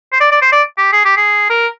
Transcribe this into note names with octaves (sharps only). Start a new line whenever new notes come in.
C5
D5
D5
C5
D5
G4
G#4
G4
G#4
A#4